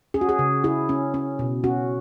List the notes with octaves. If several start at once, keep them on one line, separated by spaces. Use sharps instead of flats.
C#4 G#4
F#4
G#4
C#3
E4 G#4
C#4
C#4
B2
C#4 F#4